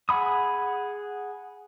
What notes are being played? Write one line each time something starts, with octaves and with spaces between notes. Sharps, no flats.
G#4 F#5 B5 D#6